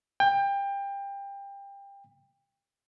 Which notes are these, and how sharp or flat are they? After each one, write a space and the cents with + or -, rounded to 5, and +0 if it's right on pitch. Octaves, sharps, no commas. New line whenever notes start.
G5 +25